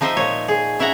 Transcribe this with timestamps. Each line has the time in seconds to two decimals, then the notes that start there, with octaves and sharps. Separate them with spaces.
0.01 F3 D#4 C5 D#5 E5
0.17 A#2 C#5
0.48 G#4
0.79 C#4 E4 E5 F#5 A#5